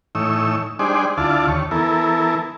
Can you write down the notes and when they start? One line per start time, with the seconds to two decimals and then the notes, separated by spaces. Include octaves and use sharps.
0.15 A2 E3 D#4 C#5 E6
0.79 G3 D4 D#4 G#4 C5 D5
1.17 D2 E4 F4 D5 A5
1.48 D#2 C#5
1.71 E3 B3 E4 A4 A#4